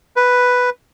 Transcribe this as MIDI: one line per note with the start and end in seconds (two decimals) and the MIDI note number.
0.16 0.70 71